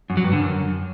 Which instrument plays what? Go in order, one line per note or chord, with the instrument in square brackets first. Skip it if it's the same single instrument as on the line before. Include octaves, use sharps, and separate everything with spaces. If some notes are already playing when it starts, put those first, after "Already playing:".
[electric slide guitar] F#2
F#3
G2
D3
F#2